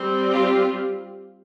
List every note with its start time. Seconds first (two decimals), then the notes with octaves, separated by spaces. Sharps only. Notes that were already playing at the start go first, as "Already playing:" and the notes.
Already playing: G3 C4
0.31 F4 G4